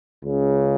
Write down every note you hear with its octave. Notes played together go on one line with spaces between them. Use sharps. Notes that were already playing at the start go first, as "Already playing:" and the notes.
C#2 C#3